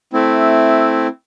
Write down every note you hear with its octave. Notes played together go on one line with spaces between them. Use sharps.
A3 C4 E4